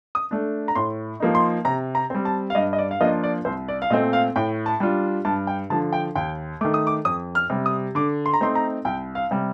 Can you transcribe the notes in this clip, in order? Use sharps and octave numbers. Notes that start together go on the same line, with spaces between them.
D#6
A3 D4
A#5
A2 C6
F3 A#3 D#4
C6
C3 A#5
A#5
G3 C4
A5
F5
G2 D#5
D#5
D5
F5
F3 A#3 D4 F4 D#5
D5
C2 C5
D5
F5
A#2 A3 C4 D#5
F5
A2 G5
A5
G3 D4 F4
G2 A5
G5
D3 F3 A5
G5
D#2 G5
D#3 A3 D6
D#6
D6
F2 D#6
F6
C3 G3
D#6
D3 D6
C6
A#5
A3 C4 D#4 C6
A#5
C2 G5
F5
C3 G3